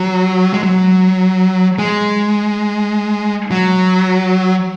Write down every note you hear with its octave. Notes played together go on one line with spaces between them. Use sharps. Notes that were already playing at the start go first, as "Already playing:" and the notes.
Already playing: F#3
G#3
F#3
G#3
F#3